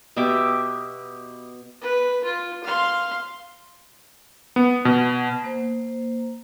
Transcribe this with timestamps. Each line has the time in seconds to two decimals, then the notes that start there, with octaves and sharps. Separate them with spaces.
0.16 B2 G4 E5 D6
1.82 B4
2.24 F4
2.64 F5 C6
4.56 B3
4.85 B2
5.44 A#3 C5